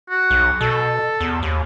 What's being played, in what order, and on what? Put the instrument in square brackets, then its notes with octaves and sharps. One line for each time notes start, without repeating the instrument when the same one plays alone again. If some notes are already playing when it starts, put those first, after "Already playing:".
[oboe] F#4
[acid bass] B1
[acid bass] B2 [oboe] A4
[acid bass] E2
D#2